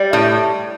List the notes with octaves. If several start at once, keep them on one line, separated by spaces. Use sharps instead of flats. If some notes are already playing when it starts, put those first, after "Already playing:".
Already playing: G3
A2